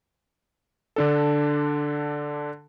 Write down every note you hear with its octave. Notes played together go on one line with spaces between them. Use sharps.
D3 D4 A4